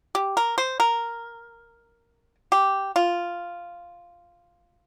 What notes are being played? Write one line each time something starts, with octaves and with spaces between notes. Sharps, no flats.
G4
A#4
C5
A#4
G4
F4